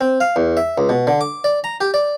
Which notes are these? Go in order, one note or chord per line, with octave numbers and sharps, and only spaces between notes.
C4
F5
E2
E5
C#2
B2
D3
D6
D5
A#5
G4
D5